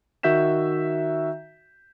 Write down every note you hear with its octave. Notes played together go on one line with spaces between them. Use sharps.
D#3 F#4 E5 G6 B6 E7